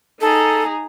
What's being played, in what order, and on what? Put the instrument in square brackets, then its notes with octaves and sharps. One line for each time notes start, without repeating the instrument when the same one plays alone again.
[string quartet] D#4 G#4 A#5 [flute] A4